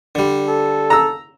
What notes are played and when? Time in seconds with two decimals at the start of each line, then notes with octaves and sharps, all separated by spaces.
0.15 D3 G3
0.48 A4
0.90 A#5 E6